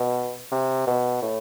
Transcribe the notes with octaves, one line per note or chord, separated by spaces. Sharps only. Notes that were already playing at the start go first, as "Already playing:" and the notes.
Already playing: B2
C3
B2
A2